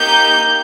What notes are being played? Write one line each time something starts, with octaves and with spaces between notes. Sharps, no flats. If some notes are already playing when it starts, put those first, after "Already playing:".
Already playing: A#3 D#4 G4 G6